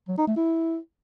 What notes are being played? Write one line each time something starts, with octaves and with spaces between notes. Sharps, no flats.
F#3
D#4
A3
E4